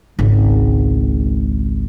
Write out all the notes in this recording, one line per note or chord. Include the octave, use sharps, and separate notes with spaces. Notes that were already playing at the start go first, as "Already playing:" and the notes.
G#1 C#2